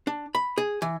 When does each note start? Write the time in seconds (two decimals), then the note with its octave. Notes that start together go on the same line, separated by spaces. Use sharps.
0.07 D4
0.35 B5
0.58 G#4
0.82 E3